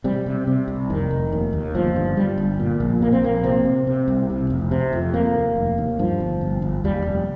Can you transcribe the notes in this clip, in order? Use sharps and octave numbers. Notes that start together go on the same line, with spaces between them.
C3 G3
C3
C3
C2
F1 D#3
F1
D#2
D#2
G1 F3
G2
G2 G3
G1
A#2
A#1
A#2 A#3
C4
A#1 A#3
C3 C4
C3
C3
C2
C3
F1
C3
F2
F1 A#3
D#2
F1
D#2
G2 F3
G1
G1
G1
D#2 G3
F1